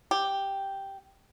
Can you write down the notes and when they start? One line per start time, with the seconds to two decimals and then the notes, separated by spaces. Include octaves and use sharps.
0.11 G4